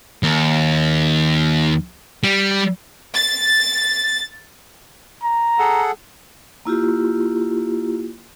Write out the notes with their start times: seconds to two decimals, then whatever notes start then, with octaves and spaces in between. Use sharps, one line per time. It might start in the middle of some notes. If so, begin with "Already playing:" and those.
0.23 D#2
2.24 G3
3.14 A6
5.23 A#5
5.59 G#4 A4 F#5
6.65 A#3 E4 F4 G4